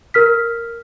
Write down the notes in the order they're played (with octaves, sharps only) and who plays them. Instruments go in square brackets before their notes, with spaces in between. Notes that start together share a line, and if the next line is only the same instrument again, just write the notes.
[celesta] A#4 F6 B6